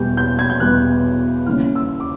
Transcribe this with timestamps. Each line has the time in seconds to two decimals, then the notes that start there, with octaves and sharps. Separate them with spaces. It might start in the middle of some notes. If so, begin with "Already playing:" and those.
Already playing: E2 B2 G3 G6
0.17 G6
0.39 G#6
0.50 G6
0.60 E2 B2 G3 F#6
1.46 D#2 C#3 E3 G3 F6
1.75 E6
2.00 D6